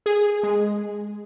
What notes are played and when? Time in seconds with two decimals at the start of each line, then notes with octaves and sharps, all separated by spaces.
0.06 G#4
0.43 G#3